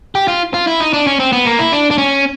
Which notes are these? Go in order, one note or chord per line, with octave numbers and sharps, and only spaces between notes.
G4
F4
F4
E4
D#4
D4
C#4
C4
B3
A#3
E4
D4
D4
C#4